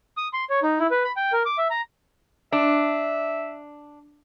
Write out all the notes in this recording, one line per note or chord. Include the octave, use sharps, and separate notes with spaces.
D#6
C6
C#5
D#4
E4
B4
B5
G5
A#4
D6
E5
A#5
D4 E5